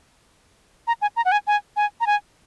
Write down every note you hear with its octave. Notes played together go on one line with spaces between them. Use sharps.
A#5
G#5
A#5
F#5
G#5
G#5
G#5
A#5
G#5